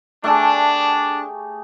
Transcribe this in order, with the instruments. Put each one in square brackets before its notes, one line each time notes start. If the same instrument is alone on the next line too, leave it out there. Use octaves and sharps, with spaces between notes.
[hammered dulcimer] A3 G4 G#4 [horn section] D4